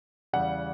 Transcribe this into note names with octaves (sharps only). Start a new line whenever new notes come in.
E2 C#3 G3 F#5